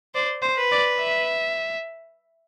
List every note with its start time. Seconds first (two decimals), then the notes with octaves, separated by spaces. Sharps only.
0.14 C5 D5
0.42 C5
0.57 B4
0.72 D5
1.00 E5